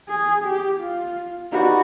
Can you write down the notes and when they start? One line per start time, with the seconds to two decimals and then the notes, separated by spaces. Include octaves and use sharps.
0.09 G#4
0.44 G4
0.80 F4
1.52 D#4 F#4 G4 B4 D5